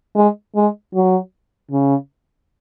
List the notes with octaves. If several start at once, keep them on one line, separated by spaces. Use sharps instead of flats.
G#3
G#3
F#3
C#3